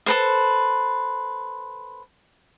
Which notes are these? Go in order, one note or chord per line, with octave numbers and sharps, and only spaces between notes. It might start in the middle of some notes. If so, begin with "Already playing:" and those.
A4 B4 C5